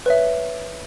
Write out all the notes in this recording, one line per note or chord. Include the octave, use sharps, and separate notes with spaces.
B4 C#5 E5